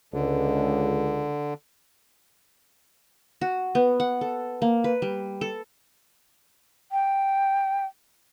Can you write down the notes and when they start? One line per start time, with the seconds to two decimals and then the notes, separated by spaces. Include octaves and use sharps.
0.14 C#2 D3
3.41 F#4
3.75 B3
4.00 F#5
4.21 A4
4.62 A#3
4.84 B4
5.02 G3
5.41 A4
6.92 G5